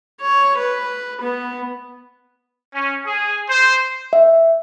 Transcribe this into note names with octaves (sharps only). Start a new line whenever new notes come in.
C#5
B4
B3
C#4
G#4
C5
E5